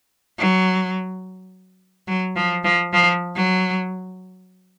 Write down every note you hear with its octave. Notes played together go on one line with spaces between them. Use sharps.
F#3
F#3
F3
F3
F3
F#3